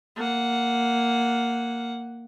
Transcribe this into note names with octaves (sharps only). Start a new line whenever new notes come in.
A#3 F#5